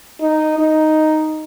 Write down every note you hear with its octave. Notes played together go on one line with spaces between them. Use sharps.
D#4
D#4